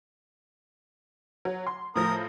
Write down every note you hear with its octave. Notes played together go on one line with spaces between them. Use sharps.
F#3
C6
A2 F3 A#4 D#6 A#6